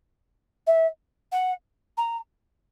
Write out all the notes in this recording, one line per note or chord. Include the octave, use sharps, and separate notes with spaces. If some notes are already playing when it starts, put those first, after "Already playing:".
E5
F#5
A#5